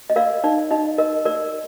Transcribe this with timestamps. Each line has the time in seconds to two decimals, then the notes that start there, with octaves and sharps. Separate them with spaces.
0.10 D#5
0.16 A#4 D5 F5
0.44 D#4 D5
0.71 D#4 D#5
0.98 A#4 D#5
1.25 A#4 D5